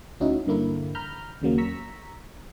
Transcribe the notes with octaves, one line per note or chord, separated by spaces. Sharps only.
D2 C#4 D#4 E4 F#4
G2 D3 A#3 E4
A#5 B5 F6 G6
D#2 C#3 F#3 A#3
A#5 C#6 E6 B6